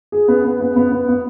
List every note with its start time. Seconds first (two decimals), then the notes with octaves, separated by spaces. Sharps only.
0.12 G#4
0.28 B3
0.44 B3
0.61 B3
0.76 B3
0.92 B3
1.08 B3